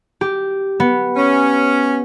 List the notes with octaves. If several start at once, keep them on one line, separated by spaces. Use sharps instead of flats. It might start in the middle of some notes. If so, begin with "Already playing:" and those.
G4
B3
C#4